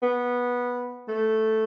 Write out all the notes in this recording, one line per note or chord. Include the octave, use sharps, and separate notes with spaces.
B3
A3